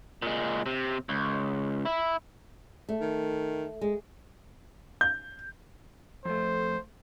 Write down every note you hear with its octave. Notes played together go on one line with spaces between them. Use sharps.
A#2 G#3
C3
C#2
E4
A3
D#3
G#3
G6
F2 A3 C5